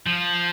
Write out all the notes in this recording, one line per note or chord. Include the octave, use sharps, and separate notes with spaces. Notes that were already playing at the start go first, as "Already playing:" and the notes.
F3